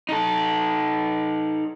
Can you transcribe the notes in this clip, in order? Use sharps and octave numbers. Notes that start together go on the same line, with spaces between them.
D#4 A4